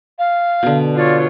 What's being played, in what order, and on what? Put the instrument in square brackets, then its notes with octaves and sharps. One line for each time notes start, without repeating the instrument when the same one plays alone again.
[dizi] F5
[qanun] B2 D3
[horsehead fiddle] F4 C#5 [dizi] D5